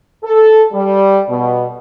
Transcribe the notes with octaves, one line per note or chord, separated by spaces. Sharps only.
A4
G3
B2